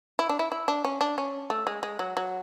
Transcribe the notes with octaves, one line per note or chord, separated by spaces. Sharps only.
E4
D4
E4
E4
D4
C#4
D4
C#4
A3
G#3
G#3
F#3
F#3